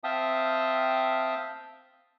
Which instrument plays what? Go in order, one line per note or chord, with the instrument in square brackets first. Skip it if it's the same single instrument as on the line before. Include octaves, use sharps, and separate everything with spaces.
[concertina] C4 E5 F5 G5 A5 D#6